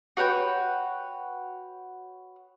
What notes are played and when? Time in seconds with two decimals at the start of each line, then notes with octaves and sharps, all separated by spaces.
0.17 F#4 B4 C#5 G5